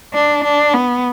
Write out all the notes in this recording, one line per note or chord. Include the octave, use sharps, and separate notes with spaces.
D4
D4
B3